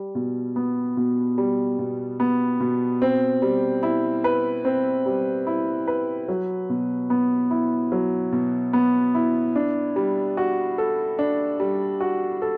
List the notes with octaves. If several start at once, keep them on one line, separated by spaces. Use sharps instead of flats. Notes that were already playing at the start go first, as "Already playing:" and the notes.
Already playing: G3
B2
B3
B2
G3
B2
B3
B2
C4
G3
E4
B4
C4
G3
E4
B4
F#3
B2
B3
E4
F#3
B2
B3
E4
D4
G3
F#4
A4
D4
G3
F#4
A4